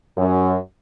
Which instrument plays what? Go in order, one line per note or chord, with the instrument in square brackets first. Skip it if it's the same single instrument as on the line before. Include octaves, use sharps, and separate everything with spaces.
[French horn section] F#2